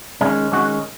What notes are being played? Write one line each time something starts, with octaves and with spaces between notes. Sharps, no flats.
D#3 G#3 C#4
D#3 G#3 C#4 F#4